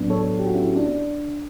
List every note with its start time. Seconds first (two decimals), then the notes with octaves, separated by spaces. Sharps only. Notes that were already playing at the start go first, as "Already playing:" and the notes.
Already playing: A2 F#3 B3 D4
0.10 A4 C#5
0.39 G4
0.46 F#4
0.54 C#4 E4
0.76 D4